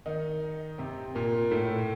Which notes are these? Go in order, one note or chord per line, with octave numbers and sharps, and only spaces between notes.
D#3 D#4
C3 C4
A#2 A#3
A2 A3